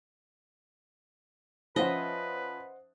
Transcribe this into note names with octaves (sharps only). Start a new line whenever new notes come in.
F3 C#4 B4 C5 D#5 E5 F#5